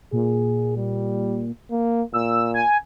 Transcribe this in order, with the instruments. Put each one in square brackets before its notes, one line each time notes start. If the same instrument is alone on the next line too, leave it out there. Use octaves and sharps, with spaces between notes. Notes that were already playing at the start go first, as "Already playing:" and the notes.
[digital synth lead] A#2 [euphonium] G#4
[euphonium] G3
A#3
[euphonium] A#2 [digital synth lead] E6
[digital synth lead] G#5